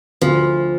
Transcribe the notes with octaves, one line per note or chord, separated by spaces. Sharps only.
D2 F3